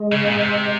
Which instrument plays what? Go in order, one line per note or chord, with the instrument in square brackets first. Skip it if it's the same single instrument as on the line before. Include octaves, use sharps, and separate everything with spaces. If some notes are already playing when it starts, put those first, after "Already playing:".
Already playing: [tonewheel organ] G#3
[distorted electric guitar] C#3
A#2
C3